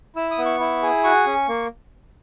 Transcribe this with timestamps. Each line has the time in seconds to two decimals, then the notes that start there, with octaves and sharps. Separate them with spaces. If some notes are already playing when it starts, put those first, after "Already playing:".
0.16 E4 E6
0.31 D#6
0.38 B3
0.46 C#6
0.60 E4
0.83 G#4
1.04 F#4 C#6
1.26 C#4
1.48 A#3